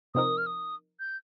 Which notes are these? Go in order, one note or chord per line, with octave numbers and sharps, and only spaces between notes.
C3 F3 C4 D#4 A#4 D#6
F6
D#6
G6